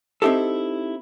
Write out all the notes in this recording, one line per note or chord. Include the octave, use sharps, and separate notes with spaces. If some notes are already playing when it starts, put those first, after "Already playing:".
C4 D#4 E4 G4 A4